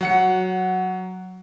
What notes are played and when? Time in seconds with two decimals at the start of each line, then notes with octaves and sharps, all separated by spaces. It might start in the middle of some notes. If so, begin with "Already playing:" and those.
0.01 F#3 F#5 C#7